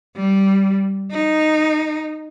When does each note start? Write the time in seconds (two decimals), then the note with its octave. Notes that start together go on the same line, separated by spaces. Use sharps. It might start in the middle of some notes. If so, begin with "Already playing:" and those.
0.16 G3
1.11 D#4